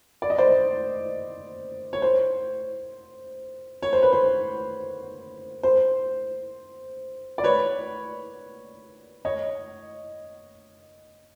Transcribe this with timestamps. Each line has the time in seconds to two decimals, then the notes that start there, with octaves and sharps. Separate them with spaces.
0.22 D5
0.30 D#5
0.38 C5 D5
1.93 C#5
2.02 C5
3.82 C#5
3.93 C5
4.02 B4
4.13 C5
5.63 C5
7.38 D5
7.44 B4 C#5
9.25 C#5 D#5